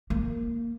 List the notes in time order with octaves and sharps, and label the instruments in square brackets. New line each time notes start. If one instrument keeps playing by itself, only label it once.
[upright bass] A#3